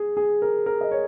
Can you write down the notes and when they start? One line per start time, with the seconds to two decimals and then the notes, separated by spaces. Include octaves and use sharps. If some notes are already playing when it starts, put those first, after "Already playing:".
Already playing: G#4
0.17 G#4
0.42 A#4
0.66 A#4
0.81 D#5
0.91 C#5